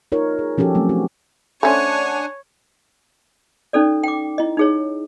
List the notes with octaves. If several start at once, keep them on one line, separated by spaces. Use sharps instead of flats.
D#4 F4 A#4 C#5
G#4
F3 C#4 F#4 G4 A4
F#3 A3 C4
F#4
A3 C#4 D4 C5 C#5 F#5 G#5
C#4 D#4 A4 D5
G5 D6
E4 D#5
D#4 G#4 C#5